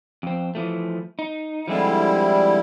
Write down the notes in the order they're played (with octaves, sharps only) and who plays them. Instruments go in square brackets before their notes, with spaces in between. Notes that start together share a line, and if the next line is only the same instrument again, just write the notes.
[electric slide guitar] F2 C4
E3 F3 A3
D#4
[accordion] D3 G3 E4 [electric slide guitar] F3 G#3 C4